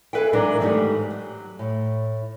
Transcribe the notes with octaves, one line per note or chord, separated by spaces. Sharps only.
G#4 A4 B4 E5 F5 G5
G#2 E3 F#3 D4 A#4
G#2 D#3 G3 A3 B3 G4
F#3
A2